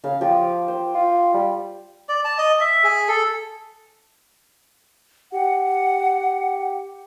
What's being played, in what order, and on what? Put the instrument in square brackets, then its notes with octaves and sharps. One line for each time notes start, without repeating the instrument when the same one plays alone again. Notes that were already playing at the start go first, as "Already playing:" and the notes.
[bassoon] C#3 [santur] F5
[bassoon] F3 [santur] F4 G4
[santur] C5
[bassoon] F4
G3
[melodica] D5
A5
D#5
E5
G#4
A4
[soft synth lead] G4 [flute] F#5